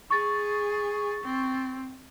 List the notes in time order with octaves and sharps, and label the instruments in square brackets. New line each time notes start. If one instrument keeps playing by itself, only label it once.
[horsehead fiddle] G#4 [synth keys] C#6 A6
[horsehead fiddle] C4